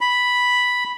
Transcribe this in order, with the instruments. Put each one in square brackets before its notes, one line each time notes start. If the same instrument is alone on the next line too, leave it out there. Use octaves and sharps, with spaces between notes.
[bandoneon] B5